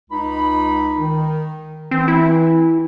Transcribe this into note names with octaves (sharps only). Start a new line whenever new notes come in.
C#2 D#4 B5
D#3
E3 C4
E4